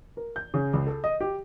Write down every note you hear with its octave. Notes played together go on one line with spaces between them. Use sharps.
A#4
G6
C#3
C#2
A4
D#5
G4